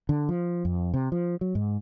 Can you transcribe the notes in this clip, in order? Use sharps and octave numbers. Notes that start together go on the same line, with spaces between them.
D3
F3
F2
C3
F3
F#3
G#2